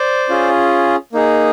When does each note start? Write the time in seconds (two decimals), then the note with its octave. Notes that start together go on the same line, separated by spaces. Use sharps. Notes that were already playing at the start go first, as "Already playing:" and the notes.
Already playing: C5 D5
0.29 C#4 F4 G#4
1.13 A#3 D#4 G#4